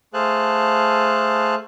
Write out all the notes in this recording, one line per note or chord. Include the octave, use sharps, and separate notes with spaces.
A3 G#4 C5 F5 A5 F#6